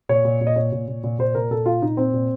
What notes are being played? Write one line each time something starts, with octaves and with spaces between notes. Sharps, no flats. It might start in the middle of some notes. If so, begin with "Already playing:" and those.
A#2 C#5
A#2
A#2
D#5
A#2 C#5
A#2
A#2
A#2
A#2 C5
A#2 A#4
A#2 A4
A#2 F4
A#2 D#4
A#2 C4
A#2